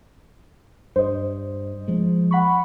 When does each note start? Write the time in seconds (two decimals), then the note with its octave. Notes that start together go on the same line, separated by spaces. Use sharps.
0.96 G2 C5 D#5
1.88 F3 G#3
2.31 F#5 B5 C#6